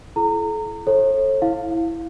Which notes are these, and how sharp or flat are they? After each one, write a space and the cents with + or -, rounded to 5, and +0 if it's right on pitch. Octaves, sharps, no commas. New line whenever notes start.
E4 +35 A4 -40 A#5 -30
A4 +0 C#5 -45
E4 +0 F5 +0